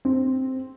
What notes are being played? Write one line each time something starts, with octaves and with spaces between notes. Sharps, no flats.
C4